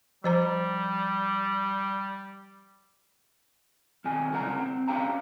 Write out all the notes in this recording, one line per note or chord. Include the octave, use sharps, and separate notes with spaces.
F3 G3 C5 A#5
B1 D#3 C4 G#5
C2 C#3 A#4 F#5 A#5
C4
C#4 D4 G4 F5 G5 A#5